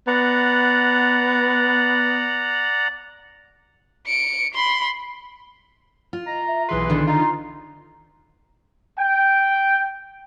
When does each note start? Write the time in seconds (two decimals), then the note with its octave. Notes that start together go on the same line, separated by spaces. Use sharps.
0.07 B3 D5 F#5 A#5
4.06 C#7 D7
4.54 B5 C6
6.13 F4
6.26 D#5 A#5
6.47 E5
6.69 B1 E3 G#4 B4 C6
6.90 D3 D#3
7.07 D#4 F4 A#5
8.98 G5